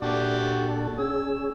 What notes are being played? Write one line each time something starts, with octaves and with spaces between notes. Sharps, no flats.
A#2 D4 F#4 G4 A4 D5
C#4 G#4 E6